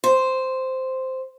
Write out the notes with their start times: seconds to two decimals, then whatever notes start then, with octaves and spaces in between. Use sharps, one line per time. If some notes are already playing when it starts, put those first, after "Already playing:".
0.04 C5